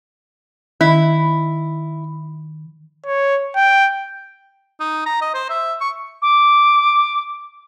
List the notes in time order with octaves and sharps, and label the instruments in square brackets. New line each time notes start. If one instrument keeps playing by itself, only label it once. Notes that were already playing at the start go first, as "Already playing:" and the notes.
[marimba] D#3 [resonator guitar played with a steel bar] E4
[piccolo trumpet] C#5
G5
[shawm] D#4
A#5
D#5
C5
E5
C#6
[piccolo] D6